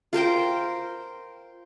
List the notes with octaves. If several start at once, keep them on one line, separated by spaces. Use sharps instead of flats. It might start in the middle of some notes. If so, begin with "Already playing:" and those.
F4 A#4 C5 G5